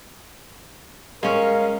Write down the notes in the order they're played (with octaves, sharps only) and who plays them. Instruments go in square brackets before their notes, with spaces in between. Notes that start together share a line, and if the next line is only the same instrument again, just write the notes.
[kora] G#3 C#4 [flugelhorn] A#4 [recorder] F5